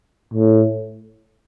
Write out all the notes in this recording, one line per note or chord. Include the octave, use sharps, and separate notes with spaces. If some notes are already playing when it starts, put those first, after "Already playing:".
A2